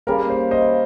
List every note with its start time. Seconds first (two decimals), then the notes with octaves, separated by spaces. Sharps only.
0.07 C#3 G3 A#3 A#4
0.30 C5
0.51 C5 D#5